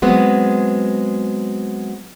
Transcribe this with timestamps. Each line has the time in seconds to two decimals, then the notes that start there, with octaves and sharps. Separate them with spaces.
0.02 F#3 G#3 B3 C4